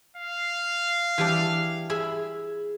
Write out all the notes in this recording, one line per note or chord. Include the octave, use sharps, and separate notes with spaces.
F5
E3 G3 D4
G#4 E5 B5